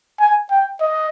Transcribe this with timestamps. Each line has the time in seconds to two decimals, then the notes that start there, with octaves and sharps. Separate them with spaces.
0.20 G#5
0.51 G5
0.81 D#5